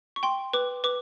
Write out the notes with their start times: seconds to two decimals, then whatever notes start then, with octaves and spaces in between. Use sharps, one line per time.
0.16 C#6
0.23 G5 C6
0.53 B4 D6
0.84 B4 D6